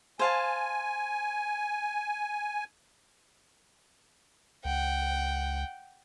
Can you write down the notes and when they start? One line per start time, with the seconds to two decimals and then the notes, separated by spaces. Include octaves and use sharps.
0.19 C5 F5 G#5 A5
4.65 C#2 F#5 G5